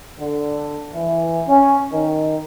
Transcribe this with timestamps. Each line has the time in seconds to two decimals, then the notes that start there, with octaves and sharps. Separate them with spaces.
0.19 D3
0.93 E3
1.47 C#4
1.93 D#3